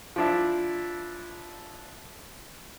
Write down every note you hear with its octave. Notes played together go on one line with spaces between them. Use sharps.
F3 D4 E4